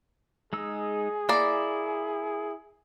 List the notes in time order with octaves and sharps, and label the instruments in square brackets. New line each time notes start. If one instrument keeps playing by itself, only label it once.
[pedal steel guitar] G#3 D#4 E6 [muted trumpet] G#4
[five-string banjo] A#3 D5 [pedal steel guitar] E4